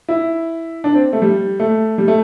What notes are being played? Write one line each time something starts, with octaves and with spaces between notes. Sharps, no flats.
E4
D4
C4
A3
G3
A3
G3
A3